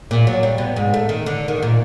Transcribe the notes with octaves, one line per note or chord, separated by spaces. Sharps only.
A#2
F#3
G3
B2
G#2
A3
D#3
D3
D#3
A#2